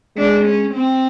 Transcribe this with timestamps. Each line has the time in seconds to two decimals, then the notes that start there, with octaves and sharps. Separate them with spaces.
0.17 G#3 D4
0.44 C#4
0.74 C4